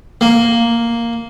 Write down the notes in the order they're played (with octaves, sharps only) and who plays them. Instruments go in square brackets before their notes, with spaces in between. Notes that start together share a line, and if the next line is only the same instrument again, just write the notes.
[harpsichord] A#3